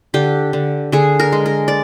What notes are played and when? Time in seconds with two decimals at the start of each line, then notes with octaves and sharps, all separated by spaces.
0.14 D3 G4
0.53 D3
0.92 D3 G#4
1.20 A#4
1.32 G#3
1.46 A#4
1.68 D5